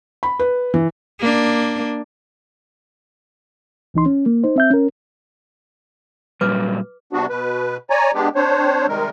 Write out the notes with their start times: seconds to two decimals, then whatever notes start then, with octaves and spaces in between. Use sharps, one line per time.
0.23 B5
0.39 B4
0.74 E3
1.19 A#3 D4
3.94 C2 E3 D#4 C6
4.06 C#4
4.26 A#3
4.44 D#4 C5
4.56 C4 E5 G6
4.70 C#4 A#4
6.41 A#2 F#3 G3 B4 D6
7.13 C3 G3 B3 D4 F#4
7.29 B2 B4
7.90 C#5 D5 G#5 A#5
8.14 G#3 B3 D4 G4
8.35 C4 D4 C5 C#5
8.88 C3 D#3 G3 G#3 A#4